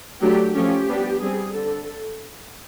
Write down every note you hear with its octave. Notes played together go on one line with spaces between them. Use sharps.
F#3 A3 D4 G4
F3 A3 C#4 G4
G3 B3 D4
G3 C4 G#4
D3 A4